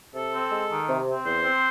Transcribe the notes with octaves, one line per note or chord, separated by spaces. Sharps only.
C3 A4
C4
G#3
D#3
C3
C4
E2 C5
C4